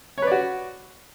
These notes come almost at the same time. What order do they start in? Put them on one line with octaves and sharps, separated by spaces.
C#5 B4 D5 F#4